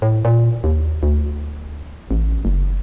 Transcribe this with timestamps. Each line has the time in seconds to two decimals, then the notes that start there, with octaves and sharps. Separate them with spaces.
0.02 A2
0.25 A#2
0.64 D#2
1.03 D2
2.11 A1
2.45 F#1